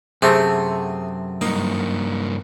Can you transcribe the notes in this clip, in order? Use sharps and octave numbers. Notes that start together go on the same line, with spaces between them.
F#2 C3 A3 C4 G#4
G2 A#3 D#4